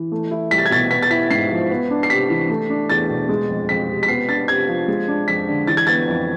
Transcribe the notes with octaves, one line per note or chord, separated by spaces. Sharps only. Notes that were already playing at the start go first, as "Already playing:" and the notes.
Already playing: E3
A3
E4
C2 B6
A6
G#6
B2 A6
B3 B6
A6
E4 B6
G#2 C7
F3
B3
D4
C7
C3 B6
E3
A3
D4
E2 A6
B2
G#3
F2
F2 B6
C3
B6
B3 C7
D4 A6
C3 G#6
F3
G#3
D4
F2 B6
D3
E3 A6
G#6
B3 A6
F2